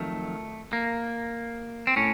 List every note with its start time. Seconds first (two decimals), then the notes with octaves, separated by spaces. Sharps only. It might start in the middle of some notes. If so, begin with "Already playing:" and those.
Already playing: F2 D#3 F#3 A3
0.73 A#3
1.87 C4
1.96 A2 C#4